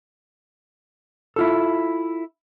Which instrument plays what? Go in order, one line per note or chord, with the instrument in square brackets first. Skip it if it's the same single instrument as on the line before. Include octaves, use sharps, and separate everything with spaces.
[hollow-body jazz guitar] E4 F4 A4